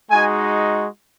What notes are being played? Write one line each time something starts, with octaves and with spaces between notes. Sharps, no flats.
G#3 D#4 F#4 G#5